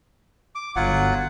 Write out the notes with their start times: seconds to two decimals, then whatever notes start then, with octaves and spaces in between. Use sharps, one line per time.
0.55 D6
0.76 G1 F#3 F4 F#5